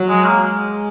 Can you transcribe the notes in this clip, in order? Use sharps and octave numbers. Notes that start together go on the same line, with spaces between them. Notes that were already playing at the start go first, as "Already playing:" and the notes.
Already playing: F#3
G#3
G#3 A#3